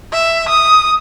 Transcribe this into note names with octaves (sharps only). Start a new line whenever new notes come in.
E5
D#6